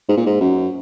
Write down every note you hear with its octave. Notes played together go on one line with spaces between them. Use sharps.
G#2
A#2
G#2
F#2